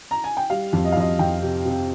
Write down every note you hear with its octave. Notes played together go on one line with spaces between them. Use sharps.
A#5
G#5
G5
G3 F5
F2
D#5
F5
F2 D#5
F2 G5
C3
C3